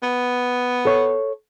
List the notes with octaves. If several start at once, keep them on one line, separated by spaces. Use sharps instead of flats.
B3
A4 C#5